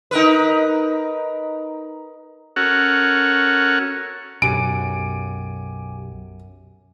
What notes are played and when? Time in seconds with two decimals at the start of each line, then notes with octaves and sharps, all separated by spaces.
0.11 D#4 A#4 B4
2.56 C#4 F#4 A4 A#4 F#5
4.42 B1 F#2 G4 G#5 D7